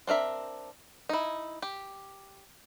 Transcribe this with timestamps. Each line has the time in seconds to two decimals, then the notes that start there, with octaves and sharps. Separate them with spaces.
0.07 C4 D4 A#4 E5
1.09 D#4 E4
1.62 G4